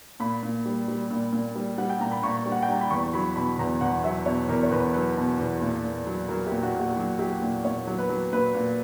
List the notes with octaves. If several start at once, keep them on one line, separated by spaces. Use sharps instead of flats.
A#2 B5
A#2
G3
G3
A#2
A#2
G3
G3 F#5
G5
A#2 A#5
B5
A#2 C#6
G3
F#5
G5
G3 A#5
B5
E2 C#6
F#3 B5
B2 B5
E2 A#5
E2 F#5
F#3 E5
B2 C#5
E2 A#4
C#5
E2 B4
F#3 B4
B2
E2
A#2
A#2
F#3
F#3 A#4
G4
A#2
F#4
A#2
G4
F#3
F#3 G4
A#2
A#2 C#5
F#3
B4
F#3
A#2 B4
A#2